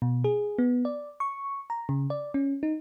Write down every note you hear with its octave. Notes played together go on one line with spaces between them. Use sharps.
B2
G#4
B3
D5
C#6
A#5
C#3
D5
C#4
D#4